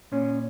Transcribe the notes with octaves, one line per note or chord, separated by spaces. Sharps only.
A#2 C#4